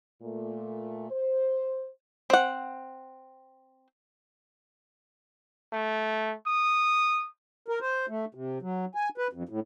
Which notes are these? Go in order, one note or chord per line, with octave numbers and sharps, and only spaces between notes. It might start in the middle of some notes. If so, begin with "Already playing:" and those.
A#2 A3
C5
C4 F#5
A3
D#6
A#4
C5
A3
C3
F#3
G#5
B4
F2
A2